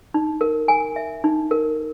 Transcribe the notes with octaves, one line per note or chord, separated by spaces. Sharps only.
D#4
A#4
G#5
E5
D#4
A#4